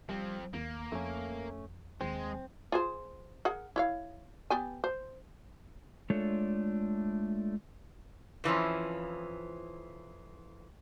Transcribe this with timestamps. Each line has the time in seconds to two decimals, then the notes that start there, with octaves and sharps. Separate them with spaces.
0.09 F3 G3 C4
0.54 D#2 A#3
0.92 F2 A3 C#4
2.01 D#2 G#3 C4
2.72 F4 G#4 C5
3.45 G#4 A#4 F#5
3.76 E4 C#5 F5
4.50 B3 G4 G#5
4.84 C5
6.10 G#3 A3 D4 F4 A4 C#5
8.44 F2 E3 F3 C#4